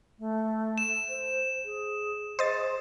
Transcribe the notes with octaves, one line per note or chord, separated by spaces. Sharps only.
A3
E7
C5
G#4
G#4 C5 D#5 A6